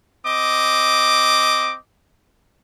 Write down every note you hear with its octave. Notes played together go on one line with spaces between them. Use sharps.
C4 D#5 D6